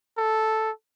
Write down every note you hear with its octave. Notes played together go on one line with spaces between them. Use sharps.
A4